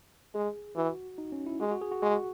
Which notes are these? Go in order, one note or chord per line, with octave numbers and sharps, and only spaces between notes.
G#3 G#4
E3 F#4
D#4
C#4
E4
G#3 F#4
F#4
G#4
F#4
G#3 F#4